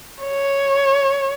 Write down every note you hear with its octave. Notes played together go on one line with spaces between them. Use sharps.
C#5